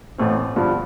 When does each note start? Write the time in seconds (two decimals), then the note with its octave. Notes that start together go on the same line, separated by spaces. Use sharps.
0.18 A1 A2 A3 C4
0.56 G2 D3 F3